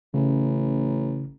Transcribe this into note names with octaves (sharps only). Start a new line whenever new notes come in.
A1 C#3